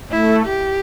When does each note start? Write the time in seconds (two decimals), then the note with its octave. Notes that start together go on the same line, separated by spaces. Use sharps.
0.11 A3 E4
0.45 G4